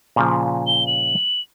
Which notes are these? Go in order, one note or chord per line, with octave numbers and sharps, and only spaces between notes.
A#2 C#3 F3
G7
F#7